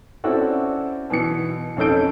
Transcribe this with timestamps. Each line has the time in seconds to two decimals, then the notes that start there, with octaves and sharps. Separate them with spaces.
0.24 C4 C#4 E4 F#4 A4 D5
1.10 B2 E3 C#7
1.77 F2 C#4 D#4 A4 G6 D7